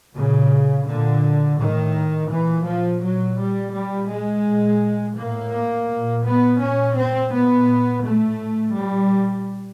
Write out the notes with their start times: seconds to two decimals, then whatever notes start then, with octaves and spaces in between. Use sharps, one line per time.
0.15 A#2 C#3
0.87 A#2 D3
1.58 A2 D#3
2.30 A#2 E3
2.66 F3
3.02 A#2 F#3
3.38 G3
3.74 A#2 G3
4.10 G#3
4.45 A#2
5.17 A2 A#3
5.89 A#2
6.25 B3
6.61 A#2 C#4
6.97 C4
7.32 A#2 B3
8.04 A2 A3
8.76 A#2 G3